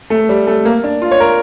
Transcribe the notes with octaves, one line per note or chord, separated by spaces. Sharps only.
A3
G3
A3
A#3
D4
F4
C#5
A#4